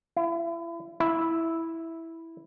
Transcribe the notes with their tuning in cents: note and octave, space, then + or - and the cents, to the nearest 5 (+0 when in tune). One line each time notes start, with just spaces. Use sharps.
E4 +35
E4 -5